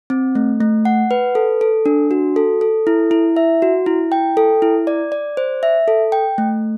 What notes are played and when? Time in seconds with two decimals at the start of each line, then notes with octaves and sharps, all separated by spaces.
0.10 C4
0.35 A3
0.61 A3
0.85 F#5
1.11 B4
1.35 A4
1.61 A4
1.86 D4
2.11 F#4
2.36 A4
2.61 A4
2.87 E4
3.11 E4
3.36 E5
3.62 F#4
3.86 E4
4.12 G5
4.37 A4
4.62 E4
4.87 D5
5.12 D5
5.37 C5
5.63 E5
5.88 A4
6.12 G5
6.38 A3